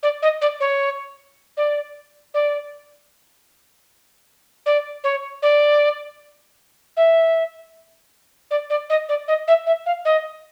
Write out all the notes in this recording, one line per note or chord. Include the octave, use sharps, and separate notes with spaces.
D5
D#5
D5
C#5
D5
D5
D5
C#5
D5
E5
D5
D5
D#5
D5
D#5
E5
E5
F5
D#5